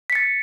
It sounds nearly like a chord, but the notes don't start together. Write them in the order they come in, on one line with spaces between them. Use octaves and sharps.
B6 C#7 A6